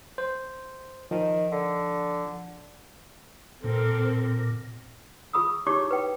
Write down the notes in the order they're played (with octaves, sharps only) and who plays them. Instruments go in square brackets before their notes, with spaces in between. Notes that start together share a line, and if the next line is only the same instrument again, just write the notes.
[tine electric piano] C5
[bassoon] D#3 [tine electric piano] F3
[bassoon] D3
[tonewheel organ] A#2 [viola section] C4 A4 A#4
[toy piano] F4 G#4 B5 D#6 E6
D#4 E4 G4 C#5 C#6 D6
B4 G5